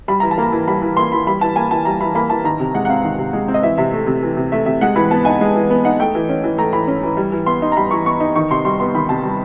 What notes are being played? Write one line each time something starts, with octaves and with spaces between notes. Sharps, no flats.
G3 B5
E3 A#5
A5
A#3 A#5
E3
G3 B5
E3
A#3 C6
E3 B5
G3 B5
E3 A5
A#3 G#5
E3 A5
G3 A#5
E3 B5
A#3 B5
E3 A5
D#3 A#5
C3
G#3 F#5
F#5
C4 F5
D#3
C3
G#3
C4
D#5
E3 E5
C3 E5
A3
C3
E3
C3
A3 E5
C3 E5
G#3 F#5
E3 B5
B3 A5
D#4 G#5
G#3
E3
B3
D#4 F#5
A3 G5
E3
C#4
E3
A3 A#5
E3 B5
C#4
E3
G3
E3
B3 C6
D#4
A#5
G3 B5
E3 C#6
B3 C#6
D#4
D#3 C#6
C3 C6
G3 C6
B3 C6
D#3 B5
C3 A5
G3